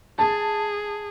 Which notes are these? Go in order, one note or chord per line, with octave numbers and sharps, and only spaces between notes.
G#4 A5